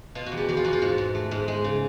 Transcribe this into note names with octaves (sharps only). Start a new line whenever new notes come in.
B2 F4
F#4
E2
G4
E2 F#4
F4
E2 F#4
F4
G#2 F#4
G#2
A3
G#2
G#3
C#3